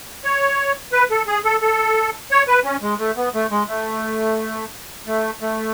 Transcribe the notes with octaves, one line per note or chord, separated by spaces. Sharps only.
C#5
B4
A4
G#4
A4
A4
C#5
B4
C#4
G#3
A3
B3
A3
G#3
A3
A3
A3